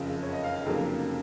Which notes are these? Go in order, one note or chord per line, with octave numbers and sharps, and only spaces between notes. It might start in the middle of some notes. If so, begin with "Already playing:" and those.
Already playing: F#1 F2 C#3 F3
C#5
D#5
F5
F5
F1 F2 C#3 F#3 A#3